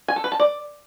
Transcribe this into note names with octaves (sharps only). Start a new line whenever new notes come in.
G#5
A4
B4
A5
D5